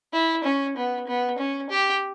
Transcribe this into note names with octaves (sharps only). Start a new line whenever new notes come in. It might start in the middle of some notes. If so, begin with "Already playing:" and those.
E4
C#4
B3
B3
C#4
G4